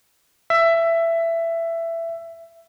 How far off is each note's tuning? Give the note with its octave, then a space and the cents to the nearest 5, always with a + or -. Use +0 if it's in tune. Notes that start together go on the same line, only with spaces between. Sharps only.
E5 +15